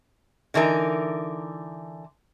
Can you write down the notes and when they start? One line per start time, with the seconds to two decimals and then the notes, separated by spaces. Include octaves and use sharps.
0.54 D3 E3 D#4 A#4